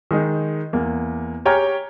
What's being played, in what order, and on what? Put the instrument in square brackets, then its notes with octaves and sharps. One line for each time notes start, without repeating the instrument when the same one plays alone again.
[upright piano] D#3 G#3 D#4
E2 A#3
G4 C#5 G5 G#5 A#5 F6